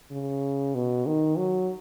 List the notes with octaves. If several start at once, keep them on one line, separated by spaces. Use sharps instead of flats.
C#3
B2
D#3
F#3